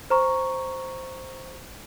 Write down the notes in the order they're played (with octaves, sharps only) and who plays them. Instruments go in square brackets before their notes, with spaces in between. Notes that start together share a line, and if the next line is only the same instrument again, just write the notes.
[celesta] C5 A#5 C#6